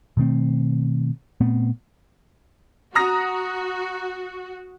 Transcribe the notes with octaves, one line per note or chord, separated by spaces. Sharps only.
B2 D#3 A3 C4
A#2 A3 B3 C4
F#4 A#5 D#6 A#6